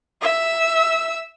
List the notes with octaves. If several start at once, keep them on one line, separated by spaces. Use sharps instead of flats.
E5 E6